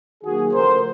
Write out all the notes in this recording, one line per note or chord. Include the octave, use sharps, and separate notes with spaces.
D#3 F#3 A#3 F#4 G#4
C#3 F3 A3 A#4 C5